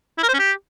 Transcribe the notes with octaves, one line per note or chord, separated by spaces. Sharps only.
E4
A#4
C5
C#4
G4